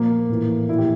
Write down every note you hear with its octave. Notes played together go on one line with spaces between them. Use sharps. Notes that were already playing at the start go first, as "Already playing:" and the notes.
Already playing: A#2 F3 A#3
A2 E3
A#2 F3 E4
G4